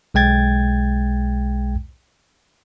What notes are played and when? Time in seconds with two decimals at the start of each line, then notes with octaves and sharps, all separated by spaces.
0.14 B1 G#3 G5 G#6 A6